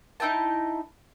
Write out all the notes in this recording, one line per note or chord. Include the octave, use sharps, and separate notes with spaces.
D#4 E4 G5 A5